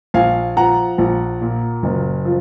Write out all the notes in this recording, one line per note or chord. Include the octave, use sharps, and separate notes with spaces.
A#1 F5 G#5
F3 F#5 A#5
A#1
A#2
F#1
F3